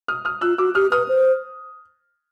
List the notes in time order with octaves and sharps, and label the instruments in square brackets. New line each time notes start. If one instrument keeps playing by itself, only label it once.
[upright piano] D#6 F6
D#6 F6
[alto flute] F4 [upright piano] E6 F#6
[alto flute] F#4 [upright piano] D6 E6
[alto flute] G4 [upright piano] D#6 F6
[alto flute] B4 [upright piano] D#6 F6
[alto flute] C5